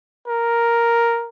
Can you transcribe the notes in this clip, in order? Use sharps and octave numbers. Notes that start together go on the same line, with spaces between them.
A#4